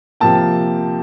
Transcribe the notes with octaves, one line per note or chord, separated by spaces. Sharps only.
C3 F3 A#3 G5 A5